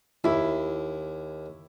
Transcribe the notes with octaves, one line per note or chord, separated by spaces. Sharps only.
D#2 E4